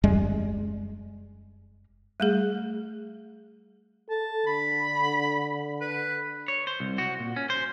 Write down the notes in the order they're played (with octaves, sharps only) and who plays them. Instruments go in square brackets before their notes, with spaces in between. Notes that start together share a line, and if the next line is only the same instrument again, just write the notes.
[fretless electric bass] F1 F#2 G3 G#3
[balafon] G3 A3 G#4
[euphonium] A4 [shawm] A5
[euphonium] D3 [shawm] B5
[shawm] B4
[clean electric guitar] C#5
C5
C2
F#4
A#2
C#4
C5